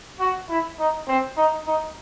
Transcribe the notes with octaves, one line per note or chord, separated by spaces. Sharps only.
F#4
E4
D#4
C4
D#4
D#4